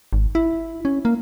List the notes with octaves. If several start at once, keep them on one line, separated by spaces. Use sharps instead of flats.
G#1
E4
C#4
A#3